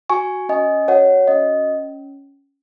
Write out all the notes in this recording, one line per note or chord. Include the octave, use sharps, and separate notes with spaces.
F#4 G#5 C#6
C#4 D#5 G#5
F#4 C#5 F#5
C#4 D#5